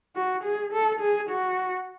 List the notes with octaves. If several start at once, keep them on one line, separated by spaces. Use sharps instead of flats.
F#4
G#4
A4
G#4
F#4